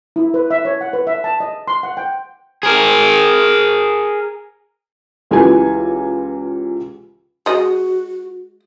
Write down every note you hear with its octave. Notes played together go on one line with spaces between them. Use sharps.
E4
B4
E5
C#5
F#5
B4
E5
A5
D#5
C6
F#5
G5
G#4 A#4
C#2 E3 F4 G4 B4 G#5
G#3 F#4 D#5